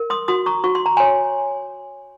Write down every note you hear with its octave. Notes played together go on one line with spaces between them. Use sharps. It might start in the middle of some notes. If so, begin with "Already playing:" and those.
Already playing: A#4
C6 D#6
F#4 C6 D#6
A#5 C#6
F#4 C#6
C6
A#5
C#5 G#5 C6